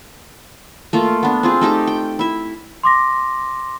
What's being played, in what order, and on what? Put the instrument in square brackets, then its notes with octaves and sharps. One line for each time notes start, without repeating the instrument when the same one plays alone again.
[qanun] A3 A#3 F4
B3 D4
C4 F4 G#4
A3 D#4 G4 A5
G5
E4 E5
[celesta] C6 D6 A#6